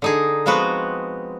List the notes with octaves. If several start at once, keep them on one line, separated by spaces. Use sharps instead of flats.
D3 D#4 G#4
F3 G#3 B3 C4 F#4 B4